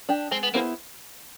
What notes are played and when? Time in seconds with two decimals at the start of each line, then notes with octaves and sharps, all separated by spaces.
0.09 D4 G4
0.31 G#3 C4
0.43 B3
0.54 A#3 B3 E4 G#4 C5